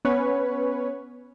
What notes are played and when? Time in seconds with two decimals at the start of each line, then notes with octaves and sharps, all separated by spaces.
0.05 B3 C#4 B4 C#5